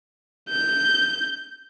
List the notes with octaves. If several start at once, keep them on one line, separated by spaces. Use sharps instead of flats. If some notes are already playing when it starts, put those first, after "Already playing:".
G6